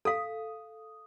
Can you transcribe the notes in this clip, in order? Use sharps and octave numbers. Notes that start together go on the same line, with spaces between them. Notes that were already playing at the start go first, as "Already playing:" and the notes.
A4 F5 D#6